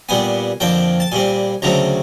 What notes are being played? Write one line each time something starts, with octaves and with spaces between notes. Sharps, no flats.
A#2 G3 B3 G#5
F2 D3 F3 A#3 G5
A5
A#2 G3 C4 G#5
D2 C#3 F#3 A3 C4 A#5